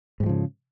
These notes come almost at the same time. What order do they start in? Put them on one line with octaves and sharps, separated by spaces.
G#2 G3 F3 C#3